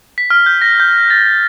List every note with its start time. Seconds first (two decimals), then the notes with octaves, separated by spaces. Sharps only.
0.18 B6
0.30 F6
0.46 G6
0.62 A#6
0.80 G6
1.10 A6
1.26 A6